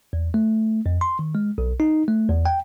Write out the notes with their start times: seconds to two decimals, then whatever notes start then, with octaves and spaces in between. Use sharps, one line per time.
0.13 E2
0.34 A3
0.86 F2
1.01 C6
1.19 D#3
1.35 G#3
1.58 B1
1.80 D#4
2.08 A3
2.29 E2
2.45 G5